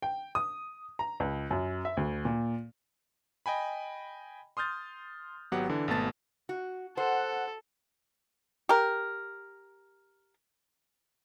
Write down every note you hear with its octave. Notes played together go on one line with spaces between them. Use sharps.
G5
D#6
A#5
C#2
F#2
E5
D2
A#2
D#5 G5 G#5 B5
C6 D#6 F6 G6 A6
G#1 F#3 B3 G4 F#5
D3 E3 D4
G#1 B2 A3 B3 A5 A6
F#4
A4 C5 F#5
G4 A#4